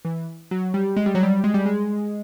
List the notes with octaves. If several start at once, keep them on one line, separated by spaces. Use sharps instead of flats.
E3
F#3
G3
G#3
G3
F#3
G3
G#3
G3
G#3